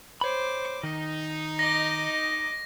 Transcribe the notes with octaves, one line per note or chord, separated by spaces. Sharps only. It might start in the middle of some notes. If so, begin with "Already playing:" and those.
C5 C#5 B5 D6
D#3 D#4 D#5
D#5 D6 A#6